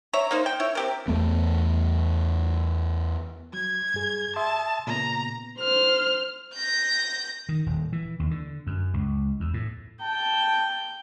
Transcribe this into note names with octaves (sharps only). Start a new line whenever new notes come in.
C#5 E5 A#5
A#3 D#4 C5
G5
E4 C#5
C4 G4 A#4
E2 A3 B3
F#3 G#6
G2 G#4
E5 A5 C6 D#6
A#2 C#3 B3 A#5
C5 F6
G6 A#6
D#3
D#1
E3
D#2
D3
F#2
C#2
E2
A2
G5 A5